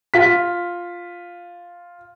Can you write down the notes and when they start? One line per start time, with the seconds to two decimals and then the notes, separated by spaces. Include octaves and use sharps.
0.14 F4 B6